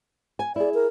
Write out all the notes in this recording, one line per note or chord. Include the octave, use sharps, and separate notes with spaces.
G#5
E4 G#4 D5
A#4